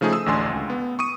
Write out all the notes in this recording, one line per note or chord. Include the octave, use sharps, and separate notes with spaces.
C#3 F3 A3 D#4 G#4
D#6 E6
A1 D2 D4 G#5 C6
C#2
B3
C#6 D#6 D#7